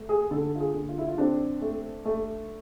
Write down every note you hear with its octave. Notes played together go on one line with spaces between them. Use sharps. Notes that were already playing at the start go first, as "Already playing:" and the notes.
Already playing: A3
G#4
D3 A4
F4
G#4
D3
F4
E4
F4
C4 D4
A3
A3